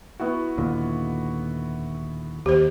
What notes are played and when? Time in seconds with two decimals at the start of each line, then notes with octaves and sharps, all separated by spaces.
0.20 B3 E4 F#4
0.58 D#2 A#2 D3
2.46 D#2 G4 C5